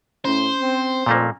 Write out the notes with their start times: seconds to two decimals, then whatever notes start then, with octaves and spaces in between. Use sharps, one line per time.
0.25 A2 C#4 C5
0.60 C4
1.06 F2 A#2 A3 A#3